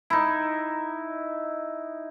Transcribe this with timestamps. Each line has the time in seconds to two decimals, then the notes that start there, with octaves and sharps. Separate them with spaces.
0.10 D#4 E4